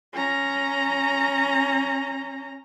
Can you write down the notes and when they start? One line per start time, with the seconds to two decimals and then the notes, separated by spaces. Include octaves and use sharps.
0.13 C#4 A#5